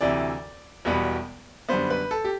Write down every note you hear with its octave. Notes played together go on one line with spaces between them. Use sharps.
D2 C3 E3 D5
E1 E2 B2 G3 B3
F#2 D3 G3 B3 C5
B4
A4
G4